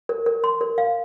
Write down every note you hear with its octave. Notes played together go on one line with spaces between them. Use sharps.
A#4
A#4
C6
A#4
F5